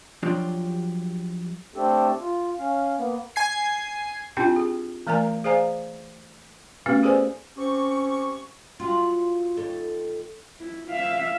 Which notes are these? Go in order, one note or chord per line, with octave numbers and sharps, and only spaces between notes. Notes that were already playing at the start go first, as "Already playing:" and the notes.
F3 F#3 D4 F4 G4
A3 C4 D4 G4 A4
F4
C#4 F5
A#3 B3
G#5 G#6 C7
C4 D4 E4 F4 G4 G5
G#4
E3 A3 A#4 D5 G#5 A#5
G#4 C5 D5 F5 G#5 A#5
A3 B3 C#4 F#4 G4 B4
G#4 A4 B4 C5 D5 G#5
C4 C#4 G4 C#6
F#3 F4
D#2 A4 C#5
E4
E5 F5